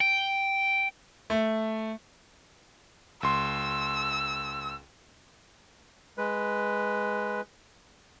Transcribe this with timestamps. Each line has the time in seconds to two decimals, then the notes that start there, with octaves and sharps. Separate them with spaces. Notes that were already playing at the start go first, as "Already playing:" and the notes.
0.01 G5
1.30 A3
3.23 C#2 C6 E6
6.18 G#3 B4